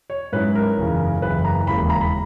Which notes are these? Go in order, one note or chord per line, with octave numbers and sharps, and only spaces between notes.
C#5
G#2 F#3 C#4 E4 B4
A#4
F#1 E2 C#3
F#1 E2 C#3 B4
A#5
E1 D#2 C#3 E3 A#3 B5
B5
A#5
B5